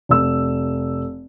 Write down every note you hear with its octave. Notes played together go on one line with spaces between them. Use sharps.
F1 E6